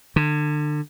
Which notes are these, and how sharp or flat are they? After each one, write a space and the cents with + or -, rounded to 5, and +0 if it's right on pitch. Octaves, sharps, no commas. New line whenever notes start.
D3 +30